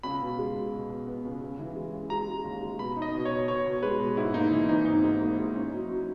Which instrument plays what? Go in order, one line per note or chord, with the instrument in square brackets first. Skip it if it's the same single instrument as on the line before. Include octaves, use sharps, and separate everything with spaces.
[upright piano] C#2 [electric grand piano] B5
[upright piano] B2
G#3
B2
B2
B2
B3
C#2
C#3
E3
G#3
C#3
[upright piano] G#3 [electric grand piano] A#5
[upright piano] G#3
D#2
G#3
[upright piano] B2 [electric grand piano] B5
[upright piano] D#4
[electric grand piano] D#5
[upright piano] B2
[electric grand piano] C#5
[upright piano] B2
[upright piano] B2 [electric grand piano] C#5
[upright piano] B2
[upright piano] G#3 [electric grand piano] B4
[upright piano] B2
[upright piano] G#2 [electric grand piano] E4
[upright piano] A#3 [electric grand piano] D#4
[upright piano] E3
[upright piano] G#1 [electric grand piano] D#4
[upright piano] G#1 [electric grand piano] D#4
[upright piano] G#2
A#3
G#2
C#4
F#3
F#3